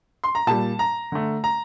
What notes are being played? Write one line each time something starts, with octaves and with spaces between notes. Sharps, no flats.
C6
A#5
A#2 G3 A5
A#5
D3 A3
A#5